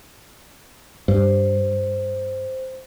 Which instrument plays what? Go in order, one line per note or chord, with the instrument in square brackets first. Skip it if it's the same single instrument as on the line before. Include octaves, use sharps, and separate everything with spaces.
[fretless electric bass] G2 [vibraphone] C5